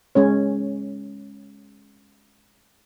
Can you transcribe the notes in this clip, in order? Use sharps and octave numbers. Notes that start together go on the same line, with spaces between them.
G#3 C#4 C#5